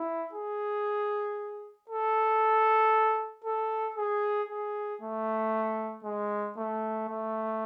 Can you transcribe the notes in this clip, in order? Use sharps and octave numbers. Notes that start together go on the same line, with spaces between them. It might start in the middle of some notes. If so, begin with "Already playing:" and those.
Already playing: E4
G#4
A4
A4
G#4
G#4
A3
G#3
A3
A3